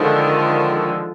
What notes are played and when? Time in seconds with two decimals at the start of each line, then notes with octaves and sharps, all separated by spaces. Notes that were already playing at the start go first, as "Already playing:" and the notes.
Already playing: D3 D#3 F3 G#3